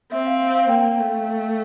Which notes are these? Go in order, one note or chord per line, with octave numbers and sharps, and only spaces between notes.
C4 E5
F5
F5
F5
A#3 G5
A3